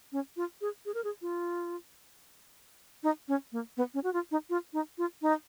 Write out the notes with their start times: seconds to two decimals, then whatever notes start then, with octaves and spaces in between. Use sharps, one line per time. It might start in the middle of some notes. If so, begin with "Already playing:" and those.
0.12 C#4
0.37 F4
0.61 G#4
0.86 G#4
0.94 A#4
1.04 G#4
1.22 F4
3.03 D#4
3.28 C#4
3.52 A#3
3.77 B3
3.94 C#4
4.04 F#4
4.13 F4
4.31 D#4
4.50 F4
4.73 D#4
4.98 F4
5.22 D#4